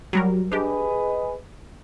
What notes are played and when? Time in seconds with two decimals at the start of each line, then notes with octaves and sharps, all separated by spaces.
0.13 F#3 G3 A#4
0.52 D4 G4 G#4 B4 D#5